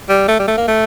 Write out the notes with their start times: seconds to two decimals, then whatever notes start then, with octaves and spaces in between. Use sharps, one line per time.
0.09 G3
0.28 A3
0.39 G3
0.48 A3
0.58 A#3
0.68 A3